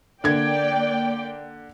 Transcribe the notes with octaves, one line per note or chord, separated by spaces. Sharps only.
D3 A#3 D5 G5 G#6